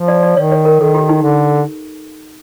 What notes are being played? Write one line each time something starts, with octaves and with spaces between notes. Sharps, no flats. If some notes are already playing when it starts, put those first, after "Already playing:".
Already playing: F3
D5
D5
D#3 C#5
C#5
A#4
D#3 A4
G4
D#4
D3